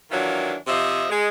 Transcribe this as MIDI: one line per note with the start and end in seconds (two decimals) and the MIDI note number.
0.11 0.55 51
0.11 0.55 52
0.11 0.55 54
0.11 0.55 62
0.11 0.55 65
0.67 1.07 48
0.67 1.07 53
0.67 1.07 75
0.67 1.07 76
1.10 1.28 56